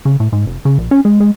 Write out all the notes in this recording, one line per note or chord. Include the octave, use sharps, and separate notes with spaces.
C#3
A2
G#2
F1
C#3
A#1
C#4
G#3
G#3